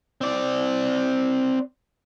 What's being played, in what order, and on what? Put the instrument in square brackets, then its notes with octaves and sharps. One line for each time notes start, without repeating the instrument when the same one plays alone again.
[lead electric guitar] C4 D5